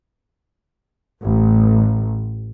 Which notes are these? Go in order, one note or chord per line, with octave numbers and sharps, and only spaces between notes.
A1